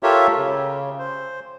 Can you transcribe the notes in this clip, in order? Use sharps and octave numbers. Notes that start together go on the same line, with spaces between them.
F4 G4 A4 A#4 C#5 E5
C#3
C5